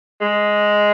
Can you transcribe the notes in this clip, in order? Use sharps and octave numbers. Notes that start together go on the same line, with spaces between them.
G#3